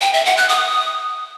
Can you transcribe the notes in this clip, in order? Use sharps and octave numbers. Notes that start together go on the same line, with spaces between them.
G5
E5
F#5
F#6
D#6